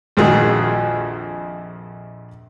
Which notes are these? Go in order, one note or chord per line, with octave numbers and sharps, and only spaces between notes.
A#1 F2 D#3 F3 F#4 G#4